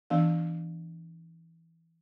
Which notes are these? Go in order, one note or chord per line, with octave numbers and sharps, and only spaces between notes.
E3 B3 D4 F5